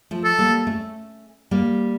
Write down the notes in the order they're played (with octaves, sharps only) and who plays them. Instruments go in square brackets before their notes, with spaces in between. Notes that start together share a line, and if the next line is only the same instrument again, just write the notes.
[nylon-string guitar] F3 A3
[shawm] A4
[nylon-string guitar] G3 A#3
A3 C#4
G3 A#3